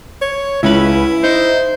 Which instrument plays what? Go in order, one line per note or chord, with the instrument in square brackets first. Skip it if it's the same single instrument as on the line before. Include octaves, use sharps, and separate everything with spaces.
[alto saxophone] C#5
[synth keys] C#2 C#4 B4 [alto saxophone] E4
[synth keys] D#4 [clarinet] C5